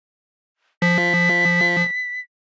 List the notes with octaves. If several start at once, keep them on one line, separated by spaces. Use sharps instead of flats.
F3 B6